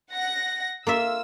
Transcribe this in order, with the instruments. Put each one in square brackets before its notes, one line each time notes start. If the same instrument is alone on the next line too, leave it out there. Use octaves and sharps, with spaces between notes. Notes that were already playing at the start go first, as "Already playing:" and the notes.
[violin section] F#5 A#6
[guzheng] A#3 F4 E5 [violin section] E6